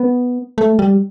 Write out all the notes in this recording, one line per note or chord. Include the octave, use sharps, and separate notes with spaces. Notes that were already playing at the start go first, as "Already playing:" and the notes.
Already playing: B3
A3
G3